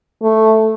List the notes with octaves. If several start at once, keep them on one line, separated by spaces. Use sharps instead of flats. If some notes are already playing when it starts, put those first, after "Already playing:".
A3